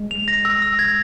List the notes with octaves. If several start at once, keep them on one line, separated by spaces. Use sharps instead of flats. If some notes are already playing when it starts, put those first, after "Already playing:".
Already playing: G#3
F7
A#6
E6
E6
G#6